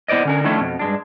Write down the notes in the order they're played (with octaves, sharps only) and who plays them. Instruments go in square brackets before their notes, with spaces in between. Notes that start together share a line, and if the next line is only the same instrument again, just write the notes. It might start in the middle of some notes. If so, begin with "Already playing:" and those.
[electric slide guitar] B3 E4 C5 D5 D#5
D3 C#4 A#4
D3 D#3 F3 A3 C#4 E4
F2 B2
G2 G#3 D4